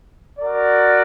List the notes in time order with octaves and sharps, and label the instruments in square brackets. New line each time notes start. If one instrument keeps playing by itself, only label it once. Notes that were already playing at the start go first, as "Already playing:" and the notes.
[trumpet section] F#4 A#4 D5